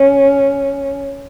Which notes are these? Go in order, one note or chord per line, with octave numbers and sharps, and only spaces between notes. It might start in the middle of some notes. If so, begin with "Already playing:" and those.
Already playing: C#4